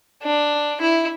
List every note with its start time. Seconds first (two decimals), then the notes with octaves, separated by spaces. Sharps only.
0.23 D4
0.81 E4